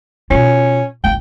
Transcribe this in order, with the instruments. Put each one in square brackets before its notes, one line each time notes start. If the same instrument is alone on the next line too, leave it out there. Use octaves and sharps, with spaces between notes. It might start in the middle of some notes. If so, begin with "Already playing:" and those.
[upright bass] B2 F4 [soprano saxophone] C#4
[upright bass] G1 C2 [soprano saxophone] G5